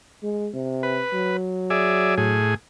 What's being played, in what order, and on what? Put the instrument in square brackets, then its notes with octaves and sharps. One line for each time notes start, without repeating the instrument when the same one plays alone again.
[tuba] G#3
C3
[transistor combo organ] B4
[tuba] F#3
[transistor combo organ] G#4 D5 E5
A2 G#4